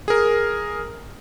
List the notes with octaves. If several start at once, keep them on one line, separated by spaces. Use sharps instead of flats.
G#4 A#4